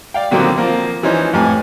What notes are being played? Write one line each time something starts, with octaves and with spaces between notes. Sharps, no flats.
D5 F5 G5
A#2 D3 D#3 F#3 A#3 C4
F3 A#3 C4
E3 F3 C#4 D#4 C5
F2 A2 G4 B4 G#5 D6